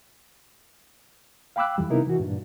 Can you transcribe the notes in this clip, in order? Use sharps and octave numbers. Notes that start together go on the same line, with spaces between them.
F5 G5 B5 D6 E6 F#6
F2 E3 G3
C3 B3 D#4 E4 A#4
E3 F#4
G2 A#2 D4